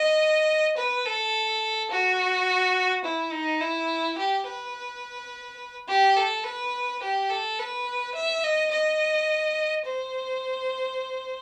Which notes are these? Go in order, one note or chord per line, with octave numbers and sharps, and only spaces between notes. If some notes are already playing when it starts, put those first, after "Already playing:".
Already playing: D#5
B4
A4
F#4
E4
D#4
E4
G4
B4
G4
A4
B4
G4
A4
B4
E5
D#5
D#5
C5